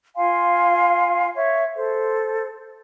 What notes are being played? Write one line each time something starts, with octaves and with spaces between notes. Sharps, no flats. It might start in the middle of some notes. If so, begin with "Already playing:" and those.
F4 F5 G#5 C6
C#5 E5
A4 C5